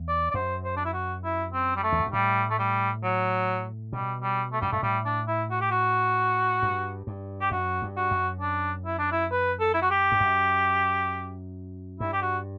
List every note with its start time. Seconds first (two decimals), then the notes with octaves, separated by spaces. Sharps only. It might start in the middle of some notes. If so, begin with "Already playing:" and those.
Already playing: E2
0.08 D5
0.31 D5
0.34 F#2 C5
0.64 C5
0.77 D4
0.85 E4
0.94 F#4
1.24 E4
1.53 C4
1.76 G3
1.84 A3
1.92 E2
2.00 F#2
2.07 G2
2.13 A2 G3
2.50 A3
2.59 G3
3.04 F#3
3.93 B2 G3
4.23 G3
4.53 A3
4.62 F#2 G3
4.72 G2 A3
4.83 A2 G3
5.05 D4
5.28 E4
5.50 F#4
5.61 G4
5.71 F#4
6.63 G2
7.07 G2
7.41 G4
7.51 F#2 F#4
7.82 G2
7.97 F#4
8.11 F#2
8.41 D4
8.86 E4
8.99 D4
9.12 E4
9.31 B4
9.60 A4
9.74 E4
9.82 F#4
9.91 G4
10.12 G2
10.21 F#2
12.00 G2 E4
12.13 G4
12.22 F#4